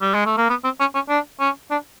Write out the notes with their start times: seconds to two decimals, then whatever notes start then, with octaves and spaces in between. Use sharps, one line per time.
0.02 G3
0.14 G#3
0.26 A3
0.37 A#3
0.49 B3
0.64 C4
0.80 C#4
0.94 C#4
1.09 D4
1.40 C#4
1.71 D4